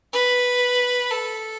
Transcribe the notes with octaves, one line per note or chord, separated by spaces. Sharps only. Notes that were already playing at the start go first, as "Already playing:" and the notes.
B4
A4